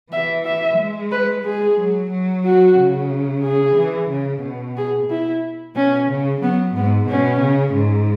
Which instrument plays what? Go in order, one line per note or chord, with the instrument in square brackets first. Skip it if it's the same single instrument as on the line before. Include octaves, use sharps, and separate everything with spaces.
[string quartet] E3 [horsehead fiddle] E5
[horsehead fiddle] E5
[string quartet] G#3
[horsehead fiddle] B4
[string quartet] G#3 [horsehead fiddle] G#4
[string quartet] F#3
F#3
[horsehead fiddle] F#4
[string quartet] C#3
[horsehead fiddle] G#4
[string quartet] E3
C#3
B2
[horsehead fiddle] G#4
E4
[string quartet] B2 [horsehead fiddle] C#4
[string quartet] C#3
[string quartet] F#3 [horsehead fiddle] B3
[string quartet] G#2 [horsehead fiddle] B3
[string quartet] B2 [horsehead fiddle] C#4
[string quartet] C#3
G#2